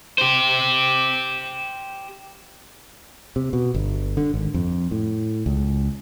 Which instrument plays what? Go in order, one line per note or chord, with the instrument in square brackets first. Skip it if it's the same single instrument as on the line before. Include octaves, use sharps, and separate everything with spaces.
[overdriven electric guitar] G4 C5
[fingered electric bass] C3
B2
G1
D3
G#1
F2
A2
C#2